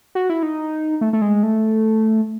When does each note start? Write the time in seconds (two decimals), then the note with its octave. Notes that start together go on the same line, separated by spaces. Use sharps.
0.15 F#4
0.30 E4
0.43 D#4
1.01 A3
1.13 A3
1.22 G#3
1.43 A3